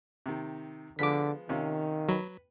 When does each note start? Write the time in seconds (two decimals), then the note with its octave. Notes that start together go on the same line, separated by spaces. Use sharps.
0.26 C3 D#3
0.99 D3 F3 G#3 B3 D6 B6
1.49 C3 D#3 C#4 F4
2.09 F#3 B4